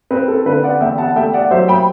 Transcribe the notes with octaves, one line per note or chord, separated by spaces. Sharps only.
C4 B4
A4
D3 B4
D5 F#5
E2 E5 G5
F#5 A5
A3 E5 G5
D5 F#5
F#3 C5 E5
G5 B5